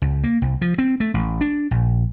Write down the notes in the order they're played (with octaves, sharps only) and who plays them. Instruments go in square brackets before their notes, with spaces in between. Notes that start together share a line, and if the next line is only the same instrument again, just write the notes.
[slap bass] C#2
A#3
C2
F3
C4
A3
A1
D4
A#1